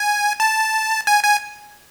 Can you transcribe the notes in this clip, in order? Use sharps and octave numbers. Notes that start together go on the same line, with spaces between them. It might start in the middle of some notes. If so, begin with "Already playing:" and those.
Already playing: G#5
A5
G#5
G#5